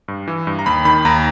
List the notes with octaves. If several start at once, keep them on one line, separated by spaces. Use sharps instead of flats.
G2
E3
G2
A#5
D#2 B5
D#3 B5
D#2 A#5